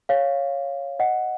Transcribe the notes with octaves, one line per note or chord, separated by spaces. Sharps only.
C#5 F5
D#5 F#5